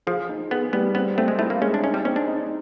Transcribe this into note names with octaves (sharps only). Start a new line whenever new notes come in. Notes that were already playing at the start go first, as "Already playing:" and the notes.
F3 G#4
D#4
B3 G#4
G3 B3
B3 C4
A3 C4
G#3
A3 E4
A#3
G#3 C#4
D4
C#4 D#4
G3
C4 C#4
D4
D#4